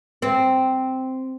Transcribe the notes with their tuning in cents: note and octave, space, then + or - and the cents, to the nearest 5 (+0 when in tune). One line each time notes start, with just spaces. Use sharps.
C4 -5